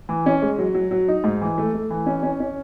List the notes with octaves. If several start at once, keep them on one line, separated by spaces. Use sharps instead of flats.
E3
C#4
G#3
F#3
F#3
F#3
D#4
G#2
E3
A3
A3
E3
C#4
C#4
C#4